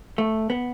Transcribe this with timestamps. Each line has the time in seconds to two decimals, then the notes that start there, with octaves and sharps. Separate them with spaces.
0.18 A3
0.50 B3